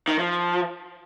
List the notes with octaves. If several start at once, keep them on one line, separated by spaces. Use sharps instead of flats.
D#3
F3